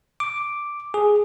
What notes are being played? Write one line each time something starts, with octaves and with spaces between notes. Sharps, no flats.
D6
G#4